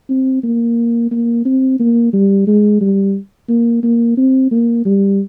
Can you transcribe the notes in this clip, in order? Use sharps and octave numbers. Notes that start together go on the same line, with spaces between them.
C4
A#3
A#3
C4
A#3
G3
G#3
G3
A#3
A#3
C4
A#3
G3